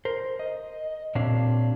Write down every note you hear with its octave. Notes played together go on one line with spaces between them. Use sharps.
A#4 C5
D#5
A#2 C4 D4 G4 C#5 F5